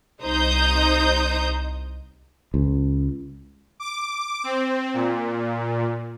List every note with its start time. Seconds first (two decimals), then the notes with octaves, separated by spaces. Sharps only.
0.21 C2 D#4 C5 D#6 G6
2.54 C#2
3.80 D6
4.44 C4
4.93 A#2